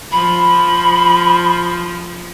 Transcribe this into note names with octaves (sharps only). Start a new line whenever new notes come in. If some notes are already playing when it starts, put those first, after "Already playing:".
F3 B5